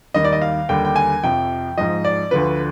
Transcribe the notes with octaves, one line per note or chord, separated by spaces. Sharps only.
D#2 D#3 G3 D#5
D5
D#5
F5
D#2 D3 G3 G5
G5
G#5
F2 C3 F3 G5
G#2 F3 D#5
D5
D2 D3 F3 B4